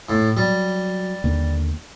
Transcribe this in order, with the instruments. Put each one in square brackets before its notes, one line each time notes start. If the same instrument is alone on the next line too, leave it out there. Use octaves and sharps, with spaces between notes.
[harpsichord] A2
[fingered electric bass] F#3 [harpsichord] G3
[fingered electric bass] D#2 D3 A#3